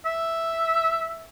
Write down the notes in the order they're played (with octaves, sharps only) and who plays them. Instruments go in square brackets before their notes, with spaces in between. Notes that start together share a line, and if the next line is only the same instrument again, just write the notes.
[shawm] E5